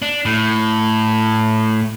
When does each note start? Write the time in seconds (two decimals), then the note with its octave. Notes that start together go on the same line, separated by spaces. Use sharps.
0.02 D4
0.25 A2